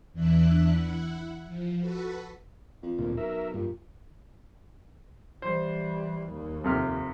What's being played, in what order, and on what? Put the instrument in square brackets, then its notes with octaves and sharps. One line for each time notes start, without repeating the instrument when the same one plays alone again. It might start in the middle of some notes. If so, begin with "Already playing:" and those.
[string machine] E2 E3 D4 E5 F#6
E4 F#5
F3
F#4 A4 B4
[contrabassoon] F2
[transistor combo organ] D2 A#2
[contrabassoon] B1 [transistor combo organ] A#4 E5
[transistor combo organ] G2 [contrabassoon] A#2
[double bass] E3 G3 [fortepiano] C5
[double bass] D#2
[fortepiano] F2 C3 F6